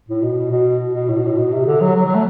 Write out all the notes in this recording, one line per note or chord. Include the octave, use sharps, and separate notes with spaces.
A2
B2
B2
B2
A2
B2
A2
B2
C3
D3
F#3
F#3
F#3
A3